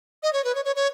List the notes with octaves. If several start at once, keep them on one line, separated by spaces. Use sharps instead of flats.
D#5
C#5
B4
C#5
C#5
C#5